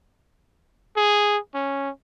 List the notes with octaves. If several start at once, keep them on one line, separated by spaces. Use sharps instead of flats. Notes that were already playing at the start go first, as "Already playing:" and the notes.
G#4
C#4